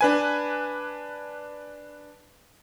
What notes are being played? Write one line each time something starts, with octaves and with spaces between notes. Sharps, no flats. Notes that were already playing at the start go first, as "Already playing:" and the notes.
D4 B4 G#5